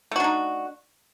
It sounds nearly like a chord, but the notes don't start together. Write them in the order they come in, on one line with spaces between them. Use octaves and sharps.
A3 F#4 D4 D#4